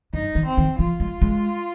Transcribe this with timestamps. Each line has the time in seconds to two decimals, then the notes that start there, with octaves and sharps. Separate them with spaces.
0.14 G2 D#4
0.35 D#3
0.46 C4
0.57 D#3
0.79 F3 F4
1.00 G#3
1.22 G#3